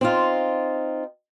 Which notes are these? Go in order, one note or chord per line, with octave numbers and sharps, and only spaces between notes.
C4 D#4 F4